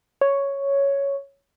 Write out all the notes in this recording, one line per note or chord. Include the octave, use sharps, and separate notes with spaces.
C#5